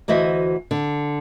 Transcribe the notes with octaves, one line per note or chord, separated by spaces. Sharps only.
D2 E3 F#4 C5 D#5 E5
D3